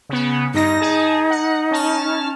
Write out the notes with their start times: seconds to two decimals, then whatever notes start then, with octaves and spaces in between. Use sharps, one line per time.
0.09 C#3 B3
0.54 G2 D#4 A#6
0.80 G#4 A5
1.31 F#5
1.71 C#4 A5 F6